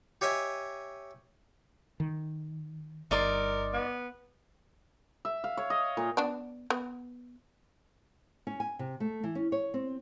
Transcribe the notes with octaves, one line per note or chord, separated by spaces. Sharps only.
G4 C#5 D#5 E5 G#5
D#3
G1 D#4 A#4 D5 C6
B3
E5
F5
C#5
D#5
A#2
B3 D4 D5
B3
C#4
G#5
C3
A3
E3
C#4
C#5
C4